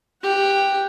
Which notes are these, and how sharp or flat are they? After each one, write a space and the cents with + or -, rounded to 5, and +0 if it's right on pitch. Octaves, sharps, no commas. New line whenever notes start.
G4 +5 F#5 +0